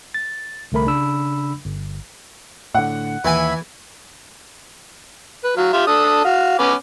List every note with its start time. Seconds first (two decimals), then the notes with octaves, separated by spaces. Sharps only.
0.14 A6
0.72 C2 D3 A3 A#4 B5
0.86 C#3 D4 B5 E6
1.65 G1
2.74 A2 D3 F#5
3.25 D#2 E3 E5 G#5 B5
5.44 B4
5.57 F#3 F5
5.73 F4 G4 E5
5.87 D4 A4 D#6
6.24 F#4 F5
6.59 B3 C#4 D6